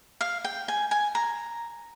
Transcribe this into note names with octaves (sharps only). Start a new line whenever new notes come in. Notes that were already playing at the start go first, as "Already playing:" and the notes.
F5
G5
G#5
G#5
A#5